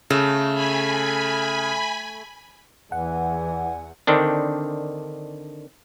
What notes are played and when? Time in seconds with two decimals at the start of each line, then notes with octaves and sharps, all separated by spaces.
0.10 C#3 A3
0.55 G#5 B5
2.92 E2 E3 G#4 D5 F#5 G#5
4.07 D3 D#3 C4 D4